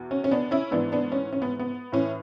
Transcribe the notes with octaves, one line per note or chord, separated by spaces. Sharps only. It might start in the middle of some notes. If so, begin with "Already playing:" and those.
Already playing: E2 B2
C#4
C#4
B3 D4
C#4 E4
G#2 E3 B3 D4
B3 D4
C#4
C#4
B3
B3
A2 E3 C#4